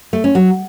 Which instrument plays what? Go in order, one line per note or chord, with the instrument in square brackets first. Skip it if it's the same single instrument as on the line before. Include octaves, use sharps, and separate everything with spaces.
[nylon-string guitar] A3
C#4
F#3